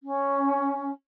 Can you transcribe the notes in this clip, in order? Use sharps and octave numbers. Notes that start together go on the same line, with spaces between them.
C#4